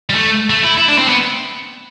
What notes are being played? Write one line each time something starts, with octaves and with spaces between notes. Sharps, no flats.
G3
A3
A3
E4
E4
D4
C4
B3